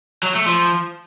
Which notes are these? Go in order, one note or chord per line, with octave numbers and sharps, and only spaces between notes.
F#3
A3
F3